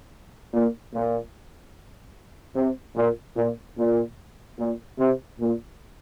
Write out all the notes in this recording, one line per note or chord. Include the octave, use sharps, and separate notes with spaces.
A#2
A#2
C3
A#2
A#2
A#2
A#2
C3
A#2